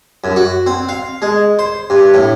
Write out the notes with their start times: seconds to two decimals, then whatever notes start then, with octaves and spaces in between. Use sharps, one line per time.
0.24 F#2
0.36 F#4
0.66 C4
0.89 F5
1.22 G#3
1.59 C5
1.90 G2
2.14 A2